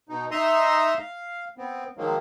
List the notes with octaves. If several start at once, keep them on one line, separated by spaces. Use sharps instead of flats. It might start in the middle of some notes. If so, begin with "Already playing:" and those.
B2 D#4
D#4 D#5 E5 A#5 C6 D#6
F5
B3 C4
D#3 F3 F#3 G#3 A#3